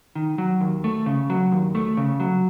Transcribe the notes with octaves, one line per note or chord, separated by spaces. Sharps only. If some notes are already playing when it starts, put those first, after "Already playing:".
D#3
F#3
D#2
A3
C#3
F#3
D#2
A3
C#3
F#3